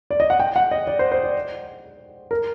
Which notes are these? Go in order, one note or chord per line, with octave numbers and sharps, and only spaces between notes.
D5
D#5
F#5
G5
F#5
D#5
D5
C5
C5
D5
A#4